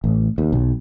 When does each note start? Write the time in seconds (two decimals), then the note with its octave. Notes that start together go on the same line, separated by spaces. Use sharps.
0.04 A1
0.38 D#2
0.52 B1